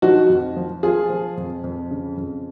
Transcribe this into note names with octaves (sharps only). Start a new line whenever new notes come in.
F3 D#4 F#4
F2
F3
F3 F4 G#4
F3
F2
F2
C#3
F2